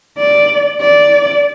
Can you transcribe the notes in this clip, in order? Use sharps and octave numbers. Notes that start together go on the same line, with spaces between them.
D5
D5